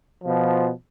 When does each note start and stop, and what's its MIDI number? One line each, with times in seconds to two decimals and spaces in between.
0.24 0.70 47
0.24 0.70 53